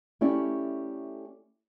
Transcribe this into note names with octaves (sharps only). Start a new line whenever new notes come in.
A3 C#4 E4 G4 A4 D5